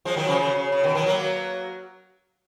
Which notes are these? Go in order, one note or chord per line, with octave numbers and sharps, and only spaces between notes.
F3 G#3
D#3 F#3
C#3 F3
C#3
C#3
C#3
B2 D#3
D#3 F#3
F#3 A#3